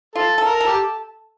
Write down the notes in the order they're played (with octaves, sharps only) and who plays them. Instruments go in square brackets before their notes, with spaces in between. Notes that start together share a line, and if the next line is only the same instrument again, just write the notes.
[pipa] F4 [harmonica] A4
[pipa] A4
[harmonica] A#4
[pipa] A4
[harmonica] G4